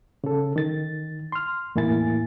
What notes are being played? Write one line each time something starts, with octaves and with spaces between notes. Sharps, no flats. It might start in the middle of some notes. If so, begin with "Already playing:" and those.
C#3 A4
D#3 A6
C6 F6
E2 A2 A#3 E4 G#5 A6